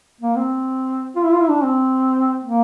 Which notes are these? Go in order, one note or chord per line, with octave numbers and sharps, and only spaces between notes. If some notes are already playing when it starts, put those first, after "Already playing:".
A#3
C4
F4
E4
F4
E4
D4
C4
A#3